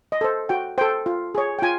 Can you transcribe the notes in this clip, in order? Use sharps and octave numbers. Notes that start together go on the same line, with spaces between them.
D#5
A4 C5
F#4 G5
A4 C5 G5
F4
G#4 C#5
G5
F4 G#5